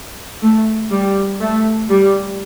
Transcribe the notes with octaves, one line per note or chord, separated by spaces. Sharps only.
A3
G3
A3
G3